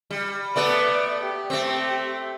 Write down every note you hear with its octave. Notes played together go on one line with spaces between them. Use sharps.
G3
A3 B3 A4 D5
G4
A3 C4